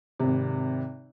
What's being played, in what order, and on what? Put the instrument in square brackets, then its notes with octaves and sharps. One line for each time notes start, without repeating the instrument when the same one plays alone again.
[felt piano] G#1 C3